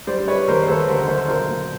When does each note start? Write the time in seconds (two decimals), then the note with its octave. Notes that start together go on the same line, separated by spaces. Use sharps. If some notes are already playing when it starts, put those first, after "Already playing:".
0.07 G3 C5 D5
0.27 G3 B4 C#5
0.48 D#2 A#4 C5
0.63 C5
0.68 D#2 A4 B4
0.88 D3 A#4 C5
1.08 D3 A#4 C5
1.28 B1 A#4 C5
1.49 A#2